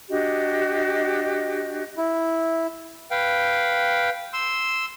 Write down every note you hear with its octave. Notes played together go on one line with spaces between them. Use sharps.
D4 F#4 G4 D#5
E4
B4 F5 G5
C6 E6